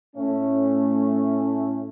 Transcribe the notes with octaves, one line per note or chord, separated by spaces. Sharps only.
A2 A3 C#4